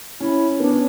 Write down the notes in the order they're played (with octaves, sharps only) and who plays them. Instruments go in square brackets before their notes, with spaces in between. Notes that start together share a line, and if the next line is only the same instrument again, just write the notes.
[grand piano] C#4 [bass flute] E4
[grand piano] B3 [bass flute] D4
[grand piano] C#4